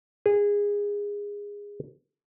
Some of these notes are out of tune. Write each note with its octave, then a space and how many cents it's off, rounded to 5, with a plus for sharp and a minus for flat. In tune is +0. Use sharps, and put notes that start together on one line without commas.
G#4 -20